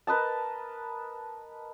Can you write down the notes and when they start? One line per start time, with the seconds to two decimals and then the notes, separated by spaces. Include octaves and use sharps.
0.07 A#4 B4 D#5 A5